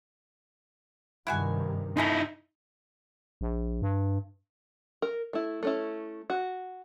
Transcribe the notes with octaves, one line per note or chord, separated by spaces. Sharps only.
G2 C3 D#3 E4 F#4 G#5
A3 D#4 E4 G#4 C6
A#1
G2
A#4
A3 E4
A3 C#4 E4
F#4